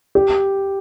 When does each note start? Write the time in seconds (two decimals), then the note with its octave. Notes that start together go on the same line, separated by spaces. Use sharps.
0.15 G4